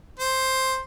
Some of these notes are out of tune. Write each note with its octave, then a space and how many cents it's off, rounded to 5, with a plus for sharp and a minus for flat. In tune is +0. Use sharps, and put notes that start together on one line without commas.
C5 +5